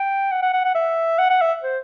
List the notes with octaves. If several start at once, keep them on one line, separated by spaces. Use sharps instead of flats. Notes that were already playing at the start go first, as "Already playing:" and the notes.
Already playing: G5
F#5
F#5
F#5
F#5
E5
F#5
F#5
E5
C5